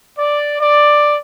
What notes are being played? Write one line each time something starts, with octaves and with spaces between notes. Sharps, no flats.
D5
D5